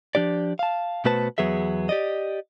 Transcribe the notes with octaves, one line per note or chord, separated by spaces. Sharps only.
F3 D4 G4 D5
F5 A5
B2 A3 F#4 B4 C5 A5
E2 F#3 B3 G#4 E5
G4 D5 D#5